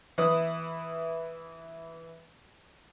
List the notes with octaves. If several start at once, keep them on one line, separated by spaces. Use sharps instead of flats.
E3 E4 B4 D#6